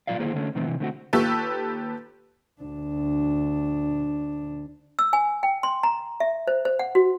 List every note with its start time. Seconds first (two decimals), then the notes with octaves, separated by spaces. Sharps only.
0.07 A#2 F#3 F4 D5 F5
0.19 D2 D#3 A#3 E4 G#4 C5
0.36 D3 A3 C#4
0.55 B2 D#3 E3 A3 B3 C4
0.67 C3 E3
0.80 D3 A3 C4 F4 F#4
1.13 D#2 F4 G4 A4 B4 C#6
2.62 D2 D4
4.99 E6
5.13 G#5
5.43 G5
5.63 C6
5.83 A#5
6.20 E5
6.47 C5
6.65 C5
6.79 F#5
6.95 F#4